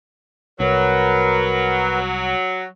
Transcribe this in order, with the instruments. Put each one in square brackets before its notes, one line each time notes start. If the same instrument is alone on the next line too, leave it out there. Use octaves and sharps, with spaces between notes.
[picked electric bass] C2 [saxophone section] F#3 [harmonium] A#4 B4